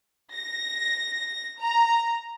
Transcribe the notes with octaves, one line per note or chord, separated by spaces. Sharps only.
A#6
A#5